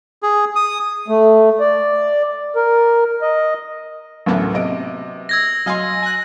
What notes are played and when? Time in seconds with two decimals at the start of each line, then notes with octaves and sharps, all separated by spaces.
0.23 G#4
0.56 D#6
1.08 A3
1.60 D5
2.56 A#4
3.22 D#5
4.26 A1 D2 F#3 A#3 B3
4.54 C3 D#5 D7
5.29 E6 G#6 A#6
5.66 F#3 D#5 F5 G#5 C6
6.02 G#5 F#6